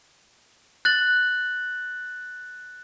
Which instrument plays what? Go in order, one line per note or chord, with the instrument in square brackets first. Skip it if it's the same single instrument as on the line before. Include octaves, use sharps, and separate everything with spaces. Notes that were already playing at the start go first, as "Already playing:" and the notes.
[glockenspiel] F#6 A6 F#7